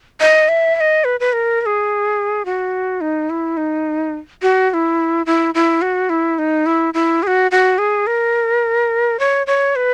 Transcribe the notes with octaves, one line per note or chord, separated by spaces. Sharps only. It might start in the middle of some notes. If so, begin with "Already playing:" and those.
D#5
E5
E5
D#5
B4
B4
A#4
A#4
G#4
F#4
D#4
E4
D#4
F#4
F#4
E4
E4
E4
F#4
E4
D#4
E4
E4
G#4
F#4
F#4
G#4
A#4
C#5
C#5
B4